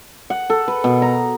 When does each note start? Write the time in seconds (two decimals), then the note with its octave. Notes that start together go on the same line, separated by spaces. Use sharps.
0.30 F#5
0.50 A4
0.68 B4
0.84 B2
1.02 A#5